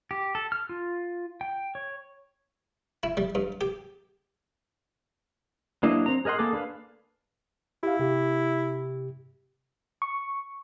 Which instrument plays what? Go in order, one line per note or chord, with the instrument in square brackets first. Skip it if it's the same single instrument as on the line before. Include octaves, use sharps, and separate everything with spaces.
[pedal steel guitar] G4
A4
F6
F4
G5
C#5
[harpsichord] E4
G3
G2
G4
[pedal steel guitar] F#3 A#3 D4 E4 D#5
C4 A#5
G#4 A#4 D#5 F#5 C6
A#3 G#4 A4 D6
D4 B4 F5
[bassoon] E4 [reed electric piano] G4 F5
[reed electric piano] C3 G4
[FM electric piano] C#6